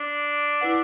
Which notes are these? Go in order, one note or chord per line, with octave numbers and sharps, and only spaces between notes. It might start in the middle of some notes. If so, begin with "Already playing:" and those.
Already playing: D4
E4 B4 F#5